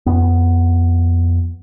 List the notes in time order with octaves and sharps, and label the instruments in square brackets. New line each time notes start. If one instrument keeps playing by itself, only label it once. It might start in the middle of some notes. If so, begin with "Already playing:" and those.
[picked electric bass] F2 B3